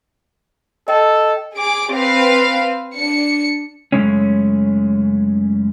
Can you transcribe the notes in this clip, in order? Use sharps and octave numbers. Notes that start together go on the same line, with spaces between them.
A4 D#5 G5 A5
G#4 D6
C4 B4 F5
D4 C#7
F#2 A#2 C#3 G#3 A3 C#4